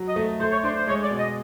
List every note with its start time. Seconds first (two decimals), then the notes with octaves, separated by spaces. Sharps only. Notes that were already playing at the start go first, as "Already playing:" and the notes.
Already playing: F#3
0.08 D#5
0.16 A3
0.40 A3 C5
0.51 C#5
0.63 D4 C5
0.76 C5
0.87 G#3 C#5
1.02 D5
1.10 B2
1.19 D#5